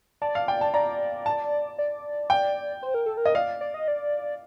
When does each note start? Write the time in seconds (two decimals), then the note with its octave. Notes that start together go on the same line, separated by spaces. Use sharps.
0.21 D5 A5
0.35 F5
0.48 G5
0.61 A5
0.74 D5 A#5
1.26 A5
1.78 D5
2.30 G5
2.82 C5
2.94 A#4
3.06 A4
3.17 A#4
3.26 D#5
3.35 D5 F5
3.61 D5
3.74 D#5
3.88 D5